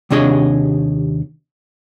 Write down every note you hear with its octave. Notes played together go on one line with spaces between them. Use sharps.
D#2 C3 D4 G#4 C#5 D#5